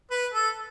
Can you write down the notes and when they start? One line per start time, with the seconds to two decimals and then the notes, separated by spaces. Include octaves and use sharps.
0.11 B4
0.34 A4